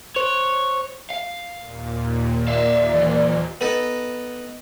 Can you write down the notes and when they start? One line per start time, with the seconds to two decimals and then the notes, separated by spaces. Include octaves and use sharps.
0.16 C5 C#5
1.10 F5
1.59 D#2 A#2
2.48 D5 E5 F5
2.94 E3 F#3
3.61 B3 D#4 A4 B4 D#5 F#5